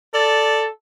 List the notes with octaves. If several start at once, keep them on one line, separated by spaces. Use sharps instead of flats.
A4 D5